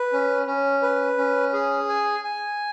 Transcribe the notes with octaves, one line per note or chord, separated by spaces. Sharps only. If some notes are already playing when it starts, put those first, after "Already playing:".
Already playing: B4
C#4
C#4
B4
C#4
G#4
G#5
G#5